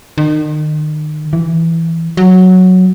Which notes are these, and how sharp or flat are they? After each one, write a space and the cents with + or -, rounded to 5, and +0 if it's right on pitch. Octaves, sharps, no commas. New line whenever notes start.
D#3 -35
E3 +0
F#3 -5